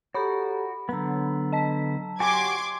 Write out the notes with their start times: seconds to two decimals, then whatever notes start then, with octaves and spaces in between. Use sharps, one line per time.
0.14 F#4 G4 A4 C#5 A#5 B5
0.89 D3 F#3 B3 A#5 E6
1.52 D#5 A5 B6
2.20 F#4 G4 C#5 G#5 C6 D6 G#6